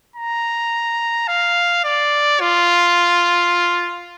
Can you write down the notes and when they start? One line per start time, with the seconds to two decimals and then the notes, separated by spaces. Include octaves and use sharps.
0.16 A#5
1.28 F5
1.85 D5
2.41 F4